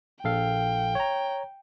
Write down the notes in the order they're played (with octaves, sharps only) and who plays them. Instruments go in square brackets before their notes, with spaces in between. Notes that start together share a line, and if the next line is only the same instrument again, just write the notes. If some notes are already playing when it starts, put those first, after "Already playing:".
[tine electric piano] A#1 A4 F5 [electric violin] G5
[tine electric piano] C#5 A#5